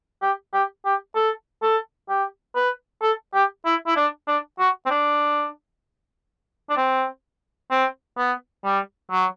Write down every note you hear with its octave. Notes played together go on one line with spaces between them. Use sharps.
G4
G4
G4
A4
A4
G4
B4
A4
G4
E4
E4
D4
D4
F#4
C4
D4
D4
C4
C4
B3
G3
F#3